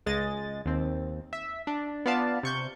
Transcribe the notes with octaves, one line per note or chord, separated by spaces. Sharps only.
C#2 G#3 D#5 A6
D#2 C4
E5
D4
B3 F4 D5 F5 A5
C3 C#6 G6